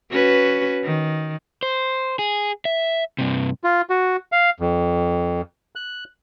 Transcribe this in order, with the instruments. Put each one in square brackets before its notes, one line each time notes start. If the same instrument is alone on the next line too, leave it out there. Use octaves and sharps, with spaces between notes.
[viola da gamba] C#4 F#4 B4
D#3
[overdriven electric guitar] C5
G#4
E5
G2 C3
[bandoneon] F4
F#4
F5
F2
F#6